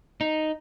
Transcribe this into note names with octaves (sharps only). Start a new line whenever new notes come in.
D#4